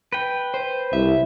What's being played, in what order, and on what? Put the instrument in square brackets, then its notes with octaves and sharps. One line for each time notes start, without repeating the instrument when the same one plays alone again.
[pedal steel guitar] B4 G5
[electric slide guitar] C5
[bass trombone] C2 [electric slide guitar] E5